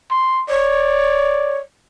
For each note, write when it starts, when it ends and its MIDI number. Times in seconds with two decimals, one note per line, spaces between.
0.11 0.44 84
0.49 1.58 73
0.49 1.61 74